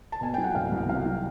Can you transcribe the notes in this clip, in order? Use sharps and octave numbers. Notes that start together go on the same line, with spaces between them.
A5
B2 G#5
F#3 G5
F#5
C2 F5
C2
F#3 F5
F#3